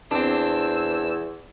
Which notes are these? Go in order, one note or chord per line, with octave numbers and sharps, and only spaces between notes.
E2 C4 D4 E6